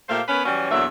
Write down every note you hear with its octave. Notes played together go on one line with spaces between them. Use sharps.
A#2 A3 G4 C5 F5
B3 C#4 A#4 B4 C#5
E3 F#3 G3 C#4
E2 A#2 F#3 A3 D4 E5